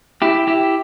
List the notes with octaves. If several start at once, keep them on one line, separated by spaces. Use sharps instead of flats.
E4 G4
E4 G4